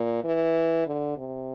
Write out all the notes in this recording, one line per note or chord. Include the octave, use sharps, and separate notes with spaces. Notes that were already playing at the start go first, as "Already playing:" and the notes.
Already playing: A#2
E3
D3
C3